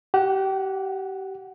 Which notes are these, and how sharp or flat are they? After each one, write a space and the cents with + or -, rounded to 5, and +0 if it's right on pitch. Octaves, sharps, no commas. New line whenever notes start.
G4 -30 F#5 +0